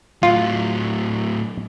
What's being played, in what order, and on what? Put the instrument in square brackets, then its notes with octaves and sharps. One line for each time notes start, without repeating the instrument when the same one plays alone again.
[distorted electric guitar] A2 F#3 [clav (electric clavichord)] F4